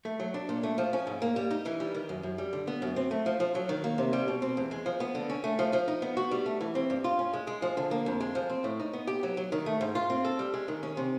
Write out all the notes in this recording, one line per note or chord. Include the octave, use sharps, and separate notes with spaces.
A3
F#3
D4
A#2
A3
F3
C#4
G#2
A#3
G3
D#4
E3
G3
D#3
F#2
F#2
G3
D3
B3
F#2
C4
A3
F3
F3
F#3
D#3
A#3
C3
G3
B2
C4
E2
G#3
F3
B3
D3
C#4
A3
F3
F3
D#4
B3
F#4
G3
A3
E3
C4
G2
F4
C#4
G#3
G#3
F3
D3
A#3
F2
G#3
F3
C4
A2
D#4
B3
G4
F#3
F#3
D#3
A3
G#2
F4
C4
A4
G3
G#3
D#3
C#4
C3